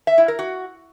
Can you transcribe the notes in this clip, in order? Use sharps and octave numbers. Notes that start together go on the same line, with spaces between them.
E5
E4
A#4
F#4